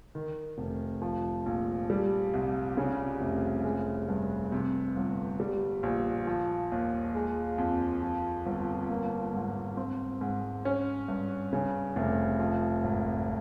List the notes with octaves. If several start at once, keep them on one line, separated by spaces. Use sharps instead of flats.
D#3
F1
F3
A#1
G3
C2
C#3
F1
G#3
G2
C3
G1
G3
A#1
F3
D#2
G#3
F2
F3
G1
A#3
G#2
C4
G#2
C#4
G2
C#3
F1
F3
G#1